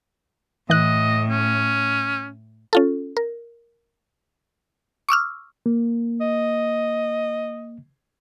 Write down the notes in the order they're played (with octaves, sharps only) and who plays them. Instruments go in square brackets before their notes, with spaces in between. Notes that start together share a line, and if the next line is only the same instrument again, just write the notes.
[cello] A2 [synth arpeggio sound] E3 F#6 [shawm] D#5
[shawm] C#4
[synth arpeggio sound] C#4 F4 A4
A#4
C#6 D6 E6 F6
[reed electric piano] A#3
[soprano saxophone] D#5